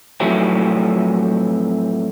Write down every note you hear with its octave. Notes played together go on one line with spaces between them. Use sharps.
F2 A2 E3 F#3 A3 C4